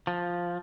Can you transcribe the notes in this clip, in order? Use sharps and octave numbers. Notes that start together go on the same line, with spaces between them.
F3